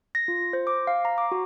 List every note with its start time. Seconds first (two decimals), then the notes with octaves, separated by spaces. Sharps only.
0.15 A#6
0.28 F4
0.53 C5
0.67 D6
0.87 F5
1.05 A#5
1.18 D6
1.32 F#4